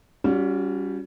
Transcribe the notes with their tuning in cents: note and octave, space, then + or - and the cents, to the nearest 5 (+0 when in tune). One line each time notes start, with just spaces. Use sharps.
G3 +0 C#4 +25 F#4 -35